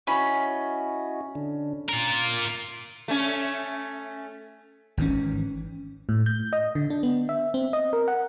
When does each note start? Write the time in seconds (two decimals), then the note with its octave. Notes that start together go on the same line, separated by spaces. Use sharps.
0.07 C#4 E4 F#4 D#5 B5
1.35 D3 D4
1.89 F4 A#4 F#6
3.08 A3 C#4
4.97 G#1 G#2 E3 C#4
6.09 A2
6.26 G6
6.53 D#5
6.75 D3
6.90 D4
7.03 B3
7.29 E5
7.54 C4
7.73 D#5
7.93 A#4
8.08 F#5